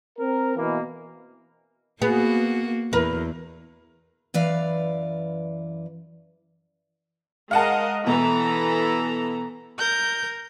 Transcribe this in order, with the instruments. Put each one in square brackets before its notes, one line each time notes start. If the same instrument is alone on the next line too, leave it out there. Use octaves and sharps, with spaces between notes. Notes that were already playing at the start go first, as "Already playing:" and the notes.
[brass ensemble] C4 A#4
B2 E3 A#3
[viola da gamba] A#3 F#4 [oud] B3 G#4
[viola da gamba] E2 [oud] A#4 B4
[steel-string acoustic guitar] F#2 E3 B4 D5 F5
[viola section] G#3 A#4 D#5 [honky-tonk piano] F5 F#5 A5
[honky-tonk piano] B2 [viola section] E3 A4 A#5
[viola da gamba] A#4 [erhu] G6